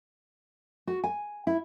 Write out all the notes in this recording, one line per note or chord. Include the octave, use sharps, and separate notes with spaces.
F#4
G#5
E4